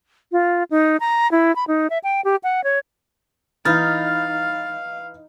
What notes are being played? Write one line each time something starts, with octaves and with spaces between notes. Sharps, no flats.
F4
D#4
A#5
E4
B5
D#4
E5
G5
G4
F#5
C#5
E3 D#4 F5 B5 F6 A6